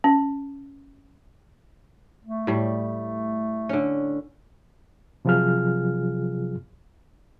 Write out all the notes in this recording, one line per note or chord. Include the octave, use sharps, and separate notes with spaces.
C#4
A3
A2 G3
D3 C#4
C3 F3 F#3 F4 G#4 F6